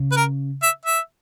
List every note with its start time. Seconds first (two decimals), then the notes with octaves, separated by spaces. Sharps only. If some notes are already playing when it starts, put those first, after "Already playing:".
Already playing: C#3
0.12 B4
0.16 A#4
0.63 E5
0.86 E5